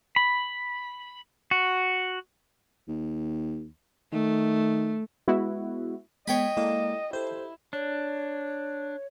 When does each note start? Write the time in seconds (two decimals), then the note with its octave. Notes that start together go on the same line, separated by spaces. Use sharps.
0.16 B5
1.51 F#4
2.88 D#2
4.12 D#3 A3
5.28 G#3 B3 E4 F#4
6.28 G#3 B3 C#5 D#5 G5 B5
6.57 G#3 A#3 E4 A4 D5
7.13 E4 G4 A4 C5
7.73 D4 C#5